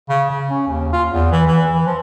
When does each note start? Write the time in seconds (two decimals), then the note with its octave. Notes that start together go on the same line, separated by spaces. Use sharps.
0.09 C#3
0.30 C#3
0.50 C#4
0.67 D#2
0.93 F4
1.09 E2
1.31 E3
1.47 E3
1.73 E3
1.87 F3